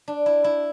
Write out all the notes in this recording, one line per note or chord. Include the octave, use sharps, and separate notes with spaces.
D4
E4
E4